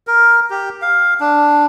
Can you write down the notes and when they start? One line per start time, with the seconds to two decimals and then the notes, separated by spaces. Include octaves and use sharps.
0.07 A#4
0.50 G4
0.82 F5
1.20 D4